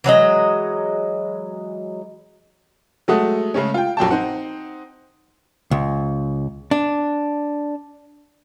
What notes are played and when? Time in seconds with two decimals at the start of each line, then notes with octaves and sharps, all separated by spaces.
0.04 E3 F#3 G#3 D#5
3.08 F#3 G#3 A3 A4 F#5 D#6
3.54 C#3 G#3 A3 C#4
3.74 F4 G5
3.97 A#1 F#2 G5 A5
4.11 C4 D#4 C5 F#5
5.71 C#2
6.71 D4